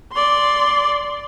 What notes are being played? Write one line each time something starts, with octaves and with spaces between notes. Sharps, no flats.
D5 C6